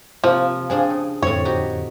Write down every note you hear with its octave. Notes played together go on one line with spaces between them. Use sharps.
C3 F3 A#3 F4 C5 F5
C4 D4 G#4 F5 G#5
C#3 D#6
F2 A2 D3 C4 C#5
D#4 F#4 G4